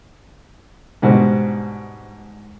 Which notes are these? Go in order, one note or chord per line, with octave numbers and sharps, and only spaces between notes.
G#2 B2 G3 D4 C5